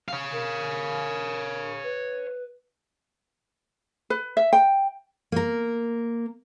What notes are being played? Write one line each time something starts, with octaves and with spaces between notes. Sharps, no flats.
C#5 F5
A#4
B4
B4
E5
G5
A#3 A#4